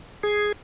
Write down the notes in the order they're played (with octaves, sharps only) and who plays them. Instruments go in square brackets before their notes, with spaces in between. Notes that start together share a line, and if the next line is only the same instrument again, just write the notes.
[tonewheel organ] G#4